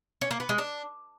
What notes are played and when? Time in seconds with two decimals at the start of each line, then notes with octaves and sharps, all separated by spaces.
0.21 C#4
0.31 A#3
0.40 B3
0.49 G#3
0.58 D4